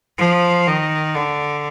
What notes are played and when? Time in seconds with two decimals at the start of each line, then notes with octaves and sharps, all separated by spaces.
0.18 F3
0.67 D#3
1.15 D3